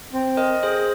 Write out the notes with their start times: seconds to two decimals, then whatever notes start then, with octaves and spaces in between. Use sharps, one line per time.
0.13 C4
0.37 A#4 D#5
0.63 G#4 C5